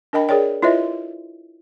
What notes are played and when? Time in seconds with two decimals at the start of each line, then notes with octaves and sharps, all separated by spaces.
0.13 D4 A#4 D#5 G5 B5
0.29 G#4 A#4 C#5 D5 G5
0.62 E4 F4 B4 C#5 D#5 E5